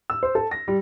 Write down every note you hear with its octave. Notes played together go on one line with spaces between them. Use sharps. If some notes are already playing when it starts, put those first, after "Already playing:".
E6
C5
A4
A#6
G3